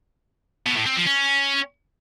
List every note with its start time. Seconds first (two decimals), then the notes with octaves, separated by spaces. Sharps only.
0.66 B2
0.76 A2
0.86 C4
0.96 F3
1.06 C#4